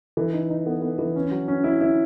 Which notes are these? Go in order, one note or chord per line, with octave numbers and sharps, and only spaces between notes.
E3
D#4
D#4
B3
B3
E3
C#4
F#3
C#4
E4
E4